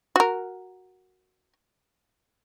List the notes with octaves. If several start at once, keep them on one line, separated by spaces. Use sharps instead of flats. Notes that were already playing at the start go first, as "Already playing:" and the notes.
F#4 A#4